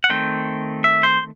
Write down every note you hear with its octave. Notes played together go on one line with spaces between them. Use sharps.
F#5
D#3 A3 C4 G5
E5
C5